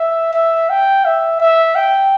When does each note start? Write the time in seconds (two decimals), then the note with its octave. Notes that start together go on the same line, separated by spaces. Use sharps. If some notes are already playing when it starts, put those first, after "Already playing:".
Already playing: E5
0.34 E5
0.70 G5
1.05 E5
1.40 E5
1.75 G5